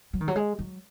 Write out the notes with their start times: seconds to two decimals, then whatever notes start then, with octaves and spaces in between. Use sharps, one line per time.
0.13 F#3
0.21 D#3
0.28 F#3
0.36 G#3
0.59 F#3